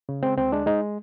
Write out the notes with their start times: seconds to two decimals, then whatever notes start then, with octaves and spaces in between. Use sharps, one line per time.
0.09 C#3
0.22 G#3 C4
0.37 D2 C4
0.52 G#3 D4
0.66 G#3 D#4